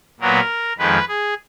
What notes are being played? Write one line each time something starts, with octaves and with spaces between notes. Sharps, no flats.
A#2 F#3 B3 A#4
F2 D#3 G#3 B4
G#4